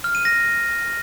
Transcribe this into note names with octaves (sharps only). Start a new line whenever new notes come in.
F6
D#7
A#6